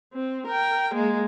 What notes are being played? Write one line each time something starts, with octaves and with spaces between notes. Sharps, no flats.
C4
A#4 G5
G#3 A#3